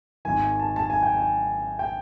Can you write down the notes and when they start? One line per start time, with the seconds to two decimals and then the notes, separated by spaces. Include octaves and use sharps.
0.25 G#1 G#2 D#3 G#5
0.60 A5
0.76 A5
0.90 G#5
1.03 G5
1.16 G#5
1.79 G5